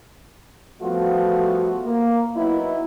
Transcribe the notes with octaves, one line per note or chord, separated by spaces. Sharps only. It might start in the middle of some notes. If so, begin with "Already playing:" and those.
F3 G3 A3 B3 F4 F#4
A#3
F#3 B3 D#4 E4